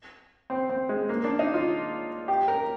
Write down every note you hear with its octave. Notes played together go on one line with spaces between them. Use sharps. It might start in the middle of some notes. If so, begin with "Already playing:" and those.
C4
C4
G#3
A#3
D4
D#4
F4
G4
A#4